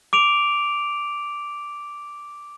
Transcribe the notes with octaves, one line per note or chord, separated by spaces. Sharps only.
D6 D7 F7